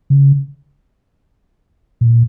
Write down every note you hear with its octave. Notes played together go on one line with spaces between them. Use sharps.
C#3
A#2